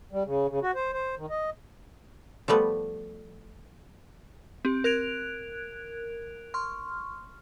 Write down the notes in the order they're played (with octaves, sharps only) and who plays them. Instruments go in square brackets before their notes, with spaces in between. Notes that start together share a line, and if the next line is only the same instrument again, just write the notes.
[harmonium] G3
C#3
C#3
F#4
C5
C5
D#3
D#5
[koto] F3 G3 A3 B3
[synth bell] C4 G4
A#4 F#6 G#6 D7 F7
C6 C#6 F6